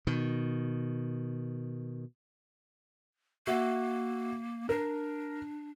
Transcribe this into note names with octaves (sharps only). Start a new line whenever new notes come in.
B2 D#3
A#3 F#4 E5
D4 A#4